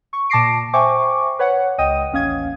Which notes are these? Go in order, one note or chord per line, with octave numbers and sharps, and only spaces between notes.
C#6
A#2 A5 D6 A#6 C7 D7
C5 E5 G5 G#5 C#6 D6
B4 C#5 F#5
C#2 D#5 G5 D#6 D#7
A1 D#2 C#4 F5 D#6 G#6